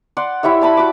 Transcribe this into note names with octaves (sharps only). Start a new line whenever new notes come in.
D5 F#5 C6
E4 G4 C#5 E5
D5 A5 B5
F#4 D6